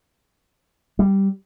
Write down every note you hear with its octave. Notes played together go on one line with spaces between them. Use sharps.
G3